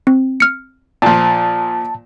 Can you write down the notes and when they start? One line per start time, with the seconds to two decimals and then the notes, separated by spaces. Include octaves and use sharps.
0.07 C4
0.40 F6 C#7
1.02 A#2 F3 A5